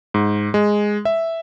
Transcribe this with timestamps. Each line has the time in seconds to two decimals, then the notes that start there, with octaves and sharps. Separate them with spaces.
0.14 G#2
0.54 G#3
1.05 E5